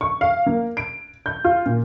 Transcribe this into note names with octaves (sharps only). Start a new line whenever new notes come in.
C#6
F5
A#3
D7
G6
F4
A#2